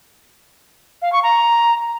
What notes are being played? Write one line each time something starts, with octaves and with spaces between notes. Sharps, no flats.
F5
C#6
A#5